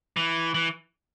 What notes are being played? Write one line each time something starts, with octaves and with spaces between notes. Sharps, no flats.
E3
E3